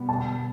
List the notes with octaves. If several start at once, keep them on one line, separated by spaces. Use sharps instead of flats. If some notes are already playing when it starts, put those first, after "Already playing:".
Already playing: B2 G3 B3
A5